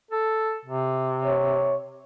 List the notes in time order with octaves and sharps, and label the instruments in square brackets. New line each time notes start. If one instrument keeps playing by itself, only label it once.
[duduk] A4
C3
[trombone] C#5